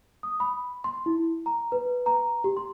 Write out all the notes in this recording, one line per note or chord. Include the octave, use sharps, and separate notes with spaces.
D#6
B5
C6
E4
A#5
B4
A#5
G4
C6